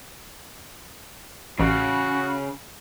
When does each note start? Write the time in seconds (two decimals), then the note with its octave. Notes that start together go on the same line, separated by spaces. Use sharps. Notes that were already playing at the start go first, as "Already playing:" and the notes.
1.59 A1 C#3 F#4